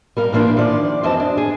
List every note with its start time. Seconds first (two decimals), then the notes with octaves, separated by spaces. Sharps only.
0.17 G3 A#4 F5
0.32 A#2 E3 A#3 D4 F4
0.57 D#3 F3 D5
1.03 F#2 E3 C4 D#5 A5
1.20 D4
1.37 G#4